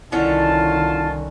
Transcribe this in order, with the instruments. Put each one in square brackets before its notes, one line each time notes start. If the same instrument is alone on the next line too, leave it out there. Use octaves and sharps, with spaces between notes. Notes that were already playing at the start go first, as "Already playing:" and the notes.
[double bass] C2 D#3 [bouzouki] D3 C#4 [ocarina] E4 [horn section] F4 A5